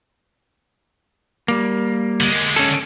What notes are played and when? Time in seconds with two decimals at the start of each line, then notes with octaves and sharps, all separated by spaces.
1.48 G3 A#3
2.20 D3 G#3
2.56 C#4 A4